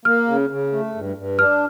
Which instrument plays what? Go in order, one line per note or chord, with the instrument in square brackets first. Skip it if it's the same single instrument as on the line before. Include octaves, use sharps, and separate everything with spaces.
[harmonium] A#3 [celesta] F6
[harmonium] C#3
C#3
A3
G2
G2
[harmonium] D4 [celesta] F6